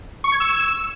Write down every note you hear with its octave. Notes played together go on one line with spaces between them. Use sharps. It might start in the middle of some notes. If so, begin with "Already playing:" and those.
C#6
G#6
E6